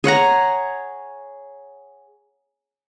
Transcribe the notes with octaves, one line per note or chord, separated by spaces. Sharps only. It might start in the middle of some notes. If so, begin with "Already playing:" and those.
G#4 C#5 F#5 A#5